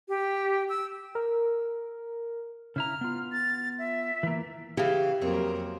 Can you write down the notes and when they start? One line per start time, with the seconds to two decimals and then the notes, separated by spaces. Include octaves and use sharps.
0.09 G4
0.69 E6
1.15 A#4
2.76 C#3 E4 A#5 F6
3.01 B3 F4
3.32 A6
3.79 E5
4.23 E3 A#3
4.77 C#3 E3 G4 F5
5.21 F2 F#3 A#3 C4 C#4 A#4